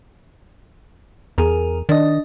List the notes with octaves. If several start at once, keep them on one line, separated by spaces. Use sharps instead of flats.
E2 G#4 A#4
D#3 D4 D#5